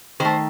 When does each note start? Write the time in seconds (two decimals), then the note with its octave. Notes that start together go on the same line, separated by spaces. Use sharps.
0.20 D#3 A3 C5